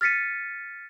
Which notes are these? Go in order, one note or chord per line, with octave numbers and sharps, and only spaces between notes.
F6 A6 B6 C#7 D#7